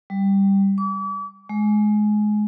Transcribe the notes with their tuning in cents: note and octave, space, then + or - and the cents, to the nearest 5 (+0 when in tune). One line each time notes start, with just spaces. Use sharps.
G3 +5
D6 -40
G#3 +20